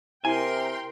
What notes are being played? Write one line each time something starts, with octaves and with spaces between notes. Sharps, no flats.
C3 E4 A#4 G5 G#5 C6